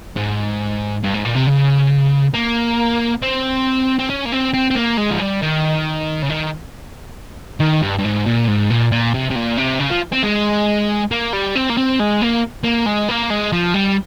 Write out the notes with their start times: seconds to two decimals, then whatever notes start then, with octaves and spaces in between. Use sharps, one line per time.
0.16 G#2
1.03 G2
1.14 G#2
1.25 A#2
1.35 C3
1.47 C#3
2.34 A#3
3.22 C4
3.99 C4
4.10 C#4
4.25 A#3
4.32 C4
4.54 C4
4.71 C4
4.76 A#3
4.98 G#3
5.11 F3
5.19 G3
5.42 D#3
6.22 C#3
6.30 D#3
7.60 D#3
7.82 G2
7.98 G2
8.04 G#2
8.26 A#2
8.48 G#2
8.70 A#2
8.92 A#2
9.14 C3
9.30 C3
9.35 A#2
9.57 C3
9.80 C#3
9.91 F3
10.12 C4
10.23 G#3
11.11 A#3
11.33 G3
11.55 C4
11.70 A#3
11.77 C4
11.99 G#3
12.21 A#3
12.64 A#3
12.86 G#3
13.08 A#3
13.30 G#3
13.52 F3
13.74 G3